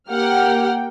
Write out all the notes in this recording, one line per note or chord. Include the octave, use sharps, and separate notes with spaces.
A#3 G4 F#5 G5 F6